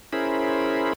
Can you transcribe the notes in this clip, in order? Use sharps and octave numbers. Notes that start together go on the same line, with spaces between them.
C#4 E4 G#4 A#4 C5 B5